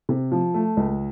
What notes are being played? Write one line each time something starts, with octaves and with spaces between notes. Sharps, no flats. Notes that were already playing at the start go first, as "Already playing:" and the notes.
C3
F3
A3
C#2